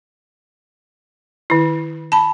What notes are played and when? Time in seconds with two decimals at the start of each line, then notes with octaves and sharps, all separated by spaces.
1.50 D#3 E4
2.12 A5 B5